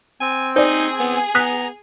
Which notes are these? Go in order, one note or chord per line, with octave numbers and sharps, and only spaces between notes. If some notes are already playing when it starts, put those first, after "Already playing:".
C4 G#5
D#4 G#4 C5 D5 G#5
B3
B3 A#5 D#6 F#6 B6